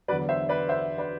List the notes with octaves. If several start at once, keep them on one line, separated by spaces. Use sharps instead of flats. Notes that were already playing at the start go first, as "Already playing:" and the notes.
E2 D3 F#3 B4 D5
C5 E5
B4 D5
C5 E5
B4 D5